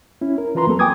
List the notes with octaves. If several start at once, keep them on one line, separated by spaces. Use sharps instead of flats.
C#4 E4
A#4
E3 F4 B4 A#5 C6
F#3 A#3 C4 A4
G5 G#5 D6 D#6 G#6